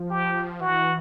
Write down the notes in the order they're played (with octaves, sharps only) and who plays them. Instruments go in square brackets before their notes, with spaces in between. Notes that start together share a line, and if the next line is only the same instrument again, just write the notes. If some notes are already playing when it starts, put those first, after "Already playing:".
Already playing: [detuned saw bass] F3
[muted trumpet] G4
[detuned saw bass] E3 [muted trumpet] F#4